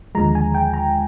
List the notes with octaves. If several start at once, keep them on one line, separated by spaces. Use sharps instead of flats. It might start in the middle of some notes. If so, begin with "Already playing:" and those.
D#2 D3 F3 G#3 A#5
G#5
G5
A#5